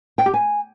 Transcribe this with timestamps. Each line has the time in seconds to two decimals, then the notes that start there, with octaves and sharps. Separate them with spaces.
0.18 G5
0.26 G4
0.34 G#5